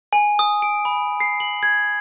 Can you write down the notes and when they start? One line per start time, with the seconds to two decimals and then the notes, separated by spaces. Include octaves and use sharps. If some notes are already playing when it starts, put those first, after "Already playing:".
0.13 G#5
0.39 D#6
0.62 D7
0.85 B5
1.20 C7
1.40 F#7
1.63 G#6